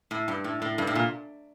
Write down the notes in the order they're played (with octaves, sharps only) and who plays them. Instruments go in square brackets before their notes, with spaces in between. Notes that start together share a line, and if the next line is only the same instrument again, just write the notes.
[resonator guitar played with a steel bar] A2
G2
A2
A2
G2
A2
A#2